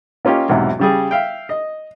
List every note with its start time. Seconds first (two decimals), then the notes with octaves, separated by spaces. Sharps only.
0.25 A#3 C#4 F4 G4 D#5
0.49 B1 E2 G#2 C3
0.79 C#3 G3 G#4
1.11 E5 F5 G5
1.49 D#5